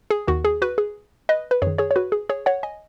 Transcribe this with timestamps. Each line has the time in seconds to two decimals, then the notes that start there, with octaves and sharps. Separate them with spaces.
0.11 G#4
0.28 D#2 D#3 F#4
0.45 G#4
0.62 F#4 B4
0.78 G#4
1.29 B4 D#5
1.51 B4
1.62 F#2 D#3 G#4 C#5
1.78 G#4 C#5
1.91 C#5
1.96 F#4 B4
2.12 G#4
2.29 G#4 C#5
2.46 C#5 F#5
2.63 D#5 G#5